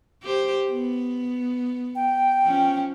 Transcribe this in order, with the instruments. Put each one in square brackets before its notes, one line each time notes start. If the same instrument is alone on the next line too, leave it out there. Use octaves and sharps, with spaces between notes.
[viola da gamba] G4 C5
B3
[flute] G5
[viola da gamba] F3 C#4